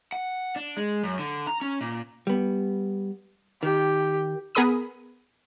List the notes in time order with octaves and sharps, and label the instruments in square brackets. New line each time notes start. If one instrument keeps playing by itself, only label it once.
[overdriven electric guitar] F#5
D4
G#3
F#2
D3
A#5
C#4
A#2
[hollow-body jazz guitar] G3 B3
[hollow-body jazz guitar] D#3 [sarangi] G4
[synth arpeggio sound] B3 G#4 A#4 B5 D#6 D#7